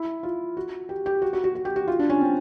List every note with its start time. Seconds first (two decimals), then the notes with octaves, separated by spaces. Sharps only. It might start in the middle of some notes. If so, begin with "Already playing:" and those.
Already playing: E4
0.23 F4
0.57 F#4
0.89 G4
1.06 G4
1.22 F#4
1.33 F#4
1.44 F#4
1.55 F#4
1.65 G4
1.76 F#4
1.87 F4
1.99 D4
2.10 C#4
2.21 C4